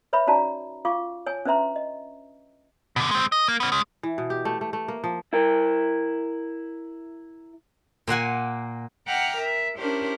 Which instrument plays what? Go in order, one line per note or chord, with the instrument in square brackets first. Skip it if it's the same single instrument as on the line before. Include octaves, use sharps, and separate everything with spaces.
[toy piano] B4 C#5 E5 B5
C#4 D#4 F#4 D5 A5 A#5
F4 F5 C#6 D6
C#5 G#5
C#4 D4 B4 E5 A#5 C6
D#5
[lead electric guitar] B2 D3
G#3 C4
D#5
A#3
B3 C#4
G#3 C#4
[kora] E3
B2
G4
A3
A3
A3
A#3
F3
[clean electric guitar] E4 A#4
[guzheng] A#2 A#3 F#5 G#5
[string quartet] E5 F#5 G5 A#5 D6 F6
A#4 E5
C#4 D4 E4 G4 A#4 C5